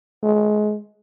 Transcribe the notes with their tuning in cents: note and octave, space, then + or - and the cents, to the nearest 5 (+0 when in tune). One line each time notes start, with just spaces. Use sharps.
G#3 +25